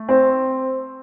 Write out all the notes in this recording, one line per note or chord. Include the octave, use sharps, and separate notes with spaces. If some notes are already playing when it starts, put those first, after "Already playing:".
Already playing: A3
C4